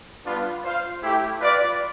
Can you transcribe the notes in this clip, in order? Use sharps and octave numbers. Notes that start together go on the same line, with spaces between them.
G3 B3 D4 F4 B4
F4 C5 F5
A3 E4 G4
F4 B4 D5